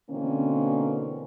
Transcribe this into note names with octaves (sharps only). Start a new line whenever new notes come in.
B2 D3 E3 A#3 C4 C#4